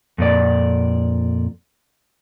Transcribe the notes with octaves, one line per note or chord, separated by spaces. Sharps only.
F2 A#2 D5